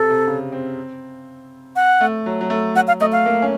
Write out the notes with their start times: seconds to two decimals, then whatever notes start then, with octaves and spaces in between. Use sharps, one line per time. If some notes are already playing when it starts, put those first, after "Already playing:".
Already playing: C3 A4
0.10 C3
0.27 C#3
0.52 C4
1.76 F#5
2.01 A3
2.26 F#3
2.41 F#3
2.50 A3
2.75 F#3 F#5
2.88 F5
3.01 A3 D#5
3.12 F5
3.26 A#3
3.42 C#4